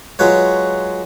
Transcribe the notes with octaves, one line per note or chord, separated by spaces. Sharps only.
F#3 G#3 F4 B4 C#5